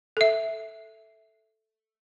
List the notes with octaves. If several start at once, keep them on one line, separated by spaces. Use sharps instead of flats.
A4 E5